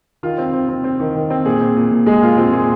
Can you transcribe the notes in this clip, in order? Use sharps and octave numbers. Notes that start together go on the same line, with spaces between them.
D#3 F4
C4
C4
C4
C4
D#3
D#3
C4
A#2 G#4
C4
A#2
A#2
G#3 G#4
A#2 F4
C4 F4
A#2 G#4